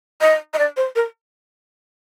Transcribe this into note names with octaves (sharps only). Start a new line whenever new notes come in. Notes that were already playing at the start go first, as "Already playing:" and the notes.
D#5
D#5
D5
C5
A#4